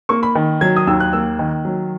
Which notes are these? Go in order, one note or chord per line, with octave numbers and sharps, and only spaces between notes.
A#3 C#6
B5
D#3
F#3 G#6
D#6
D#2 E6
F#6
A#3 E6
D#3
F#3